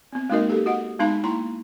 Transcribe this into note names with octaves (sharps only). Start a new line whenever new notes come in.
B3 C4
G#3 A#3 D#4 F#4 A#4 D#5
G4 A4
F#4 D#5 F#5
G#3 B3 D#4 F5 A5 B5
A#3 E4 A#5 C6